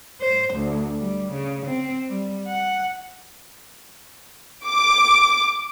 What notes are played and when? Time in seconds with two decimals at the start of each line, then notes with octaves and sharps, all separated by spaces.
0.21 C5
0.54 D2
1.00 G3
1.33 C#3
1.66 C4
2.10 G3
2.47 F#5
4.67 D6